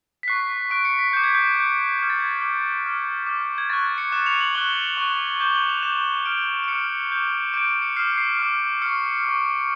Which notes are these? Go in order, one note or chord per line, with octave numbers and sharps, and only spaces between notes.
B6
C#6 F#6 C7
C#6 F#6 D7
C#7
B6
D6 G6
G#6
G6
D6 G6
D6 F6 G#6
A6
G#6
D6 F6
D6 F6
D6 F6
G#6
C#6 F#6 A6
C#7
C#6 F#6 E7
F7
F#7
C#6 F#6 G7
C#6 F#6
D6 G6 G7
F#7
F7
D6 G6 E7
D6 F6 D7
D7
D6 F6 C#7
D6 G6
D6 G6 D7
C#7
D6 F6 C7
C7
D6 F6
C#6 F6 C#7
C#6 F6